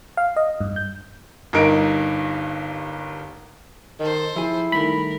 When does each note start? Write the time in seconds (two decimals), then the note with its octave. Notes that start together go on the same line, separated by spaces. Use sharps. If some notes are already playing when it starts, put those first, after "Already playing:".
0.17 F5
0.36 D#5
0.61 G2
0.76 G6
1.53 G1 G2 D#4 A#4 D7
4.00 D#3 A4 C5
4.36 F3 E4 G#4
4.72 G2 D#3 A3 A#4 B5